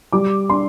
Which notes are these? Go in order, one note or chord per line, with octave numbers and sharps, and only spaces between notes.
G3 D6
D4 C6